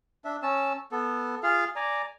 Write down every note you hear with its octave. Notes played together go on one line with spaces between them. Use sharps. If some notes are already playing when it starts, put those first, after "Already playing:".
D4 E5
C#4 A5 E6
B3 A4
F4 G#4 F5
D5 G#5 A#5